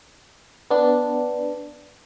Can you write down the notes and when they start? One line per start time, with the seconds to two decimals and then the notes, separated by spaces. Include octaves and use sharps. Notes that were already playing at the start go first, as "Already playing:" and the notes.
0.71 B3 D4